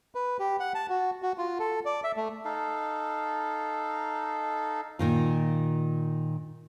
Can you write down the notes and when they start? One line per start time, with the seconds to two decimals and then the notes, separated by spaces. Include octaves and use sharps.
0.15 B4
0.40 G4
0.60 F#5
0.75 A5
0.89 F#4
1.22 F#4
1.38 F4
1.60 A4
1.85 D5
2.04 E5
2.17 A3
2.45 D#4 A4 F5
4.99 A#2 D#3 F4